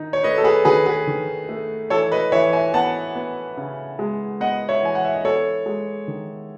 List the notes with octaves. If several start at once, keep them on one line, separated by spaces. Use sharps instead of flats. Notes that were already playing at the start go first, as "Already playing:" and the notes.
Already playing: D#3 D#4
C#5
A3 B4 D#5
A4
G#4 B4
D#3 G#4 B4
G#4 B4
D#3
A3
E3 A4 C#5
B4 D#5
E3 C#5 E5
E5 G#5
B3 F#5 A5
B3
C#3
G#3
B3 D#5 F#5
C#5 E5
E3 G#5
F#5
E5
D#5
B3 A4 C#5
G#3
D#3